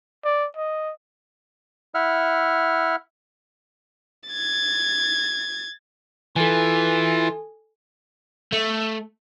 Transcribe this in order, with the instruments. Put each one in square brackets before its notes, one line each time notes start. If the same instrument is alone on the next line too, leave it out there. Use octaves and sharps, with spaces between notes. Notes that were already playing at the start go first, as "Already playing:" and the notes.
[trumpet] D5
D#5
[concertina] E4 E5 F#5 F6
[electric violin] G#6 A6
[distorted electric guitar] E3 [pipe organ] F4 [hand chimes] A4 G#5
[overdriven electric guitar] A3